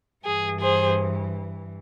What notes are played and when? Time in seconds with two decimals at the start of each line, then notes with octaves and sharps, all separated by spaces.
0.24 G2 E3 G#4
0.61 G#4 C5